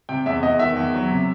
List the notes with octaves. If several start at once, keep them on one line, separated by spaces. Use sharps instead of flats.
C3 G5
E2 E5
E2 D#5
D#3 E5
E2
F#3
C3